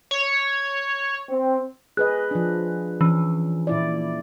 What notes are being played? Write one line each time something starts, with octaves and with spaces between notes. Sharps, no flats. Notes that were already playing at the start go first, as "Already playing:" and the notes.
C#5
C4
G#4 B4 D#5 F#6
F3 D4
E3 C#4
A#2 E4 D5